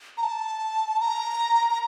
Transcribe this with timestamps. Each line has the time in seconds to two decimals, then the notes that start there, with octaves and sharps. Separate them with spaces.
0.18 A#5
0.23 A5
1.00 A#5
1.70 A#5